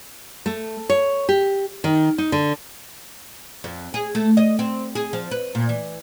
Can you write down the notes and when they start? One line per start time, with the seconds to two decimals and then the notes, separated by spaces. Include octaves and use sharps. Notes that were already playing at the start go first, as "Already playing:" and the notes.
0.46 A3
0.90 C#5
1.29 G4
1.84 D#3
2.18 D#4
2.32 D3
3.64 F2
3.94 G#4
4.15 A3
4.37 D#5
4.59 C4
4.95 G#4
5.13 F3
5.31 B4
5.55 A#2
5.69 E3